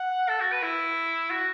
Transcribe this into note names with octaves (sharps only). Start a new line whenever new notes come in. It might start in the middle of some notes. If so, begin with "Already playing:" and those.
Already playing: F#5
A4
F#4
B4
E4
F#4